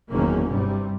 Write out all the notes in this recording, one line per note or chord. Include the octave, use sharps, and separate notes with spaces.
F#1 E2 D#3 A#3 C#4
G2 C3 G3